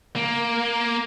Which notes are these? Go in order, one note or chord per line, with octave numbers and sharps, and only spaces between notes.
A#3